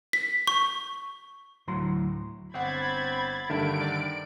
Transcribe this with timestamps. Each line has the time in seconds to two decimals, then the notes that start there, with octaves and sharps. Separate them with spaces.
0.13 B6
0.47 C#6
1.68 D2 A2 F#3 A#5 C6
2.54 G1 C4 F#5 B5 G#6 A6
3.50 G2 D3 D#3 A3 D7
3.81 D5